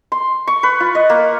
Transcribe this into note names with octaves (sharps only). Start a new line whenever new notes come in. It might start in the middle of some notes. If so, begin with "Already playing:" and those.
C6
C#6
B4
F4
D#5
A#3